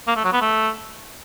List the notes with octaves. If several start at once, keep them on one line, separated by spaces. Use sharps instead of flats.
A#3
A3
F#3
B3
A3